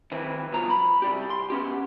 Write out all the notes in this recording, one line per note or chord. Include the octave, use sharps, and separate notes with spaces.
D#3 E3 C4 B4
C2 B2 F3 A#5
B5
C2 G3 G4
C6
B3 C#4 G4